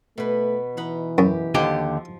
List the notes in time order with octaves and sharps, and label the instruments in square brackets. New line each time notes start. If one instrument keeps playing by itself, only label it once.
[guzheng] B2 B4 [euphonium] A3
[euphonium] E3 [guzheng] D#4 F#5 B5
[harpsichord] F#2 [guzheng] G4
[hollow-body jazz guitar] D#2 D3 G4 [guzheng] F3